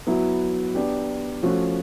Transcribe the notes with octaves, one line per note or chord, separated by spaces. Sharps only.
F#3 B3 E4
B3 D4 G4
F3 A3 C#4 F#4